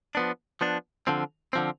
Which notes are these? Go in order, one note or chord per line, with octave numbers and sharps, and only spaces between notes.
F3 B3 D4
F3 B3 D4
D3 F3 C4
D3 F3 C4